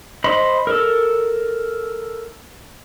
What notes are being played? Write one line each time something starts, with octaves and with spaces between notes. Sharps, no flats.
C5 D#5 B5
A4 A#4